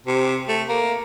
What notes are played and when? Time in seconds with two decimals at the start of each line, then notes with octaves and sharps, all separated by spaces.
0.06 C3
0.48 A3
0.68 A#3